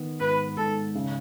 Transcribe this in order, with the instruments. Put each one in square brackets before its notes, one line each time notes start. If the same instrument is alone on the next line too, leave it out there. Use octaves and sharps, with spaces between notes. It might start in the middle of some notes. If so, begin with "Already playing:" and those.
Already playing: [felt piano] D#3 B3
[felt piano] G#2 [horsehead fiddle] B4
[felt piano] G#2 [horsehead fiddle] A4
[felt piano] C#3